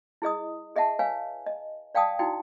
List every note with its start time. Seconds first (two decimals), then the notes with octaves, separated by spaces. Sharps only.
0.22 E4 G#4 D#5 D#6
0.76 G#4 D#5 E5 F#5 A5
0.99 B4 C#5 F5 G#5
1.46 D#5
1.95 D5 F5 G5 A5 D#6
2.19 D#4 E4 F#4 G5